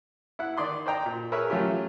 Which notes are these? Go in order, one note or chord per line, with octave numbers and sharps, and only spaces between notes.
E4 F#5
D#3 D5 C6 D#6
C5 D5 D#5 G5 A#5
A#2
G#4 A#4 B4 C#5 E5
F#3 A3 C#4 F4 G4